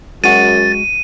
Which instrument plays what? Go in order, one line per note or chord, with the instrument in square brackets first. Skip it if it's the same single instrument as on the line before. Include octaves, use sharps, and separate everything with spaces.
[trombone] F#2 [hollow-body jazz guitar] G#3 F#4 [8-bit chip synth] A6 [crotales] D#7